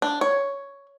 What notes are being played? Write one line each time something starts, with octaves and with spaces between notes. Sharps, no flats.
D4
C#5